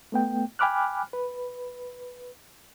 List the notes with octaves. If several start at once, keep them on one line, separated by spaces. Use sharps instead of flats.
A3 B3 G5
G5 G#5 B5 D6 F6 F#6
B4